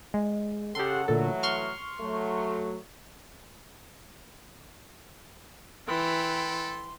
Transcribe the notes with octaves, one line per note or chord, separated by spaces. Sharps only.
G#3
C#3 G4 A4 F#5 C6
A#2 D3 E3 F#3 A3 A4
C6 C#6 F6
F#3 A3
E3 A4 G5 B5 C6